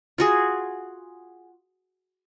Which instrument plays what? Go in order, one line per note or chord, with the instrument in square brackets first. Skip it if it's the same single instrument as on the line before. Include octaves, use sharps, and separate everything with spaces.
[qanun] F4 F#4 G#4